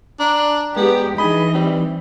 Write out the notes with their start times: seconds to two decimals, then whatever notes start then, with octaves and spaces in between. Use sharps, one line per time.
0.20 D4 D5 A#5
0.76 G#3 B3 G4
1.18 E3 D4 D#4 G#4 D#5 B5
1.54 G3 C4